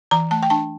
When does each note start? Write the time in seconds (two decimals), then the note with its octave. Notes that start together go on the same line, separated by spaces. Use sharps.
0.11 E3 A#5
0.31 A3 A5
0.43 G5
0.50 D4 A5